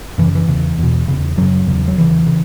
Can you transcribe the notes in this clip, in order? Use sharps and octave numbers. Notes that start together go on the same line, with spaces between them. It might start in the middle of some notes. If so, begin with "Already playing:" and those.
F#2 C#3 E3
E3
E2 C#3
E2 B2
E2 C#3
F#2 C#3 F#3
E2 C#3
F#3
E2 C#3 E3
C#3